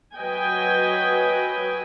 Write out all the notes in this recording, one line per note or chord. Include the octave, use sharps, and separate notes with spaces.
F#3 B4 D#5 G5 G#5